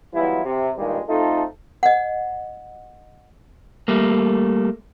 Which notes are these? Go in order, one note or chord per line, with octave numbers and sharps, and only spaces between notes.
E3 F#3 G3 B3 E4 F4
C3
G2 A#2 D#3 G3 G#3
A3 C4 D#4 F4 A4
D#5 F#5
G3 A3 A#3